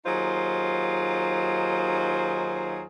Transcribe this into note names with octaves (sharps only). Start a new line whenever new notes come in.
D#2 F#3 D#4 F4 G#4 C5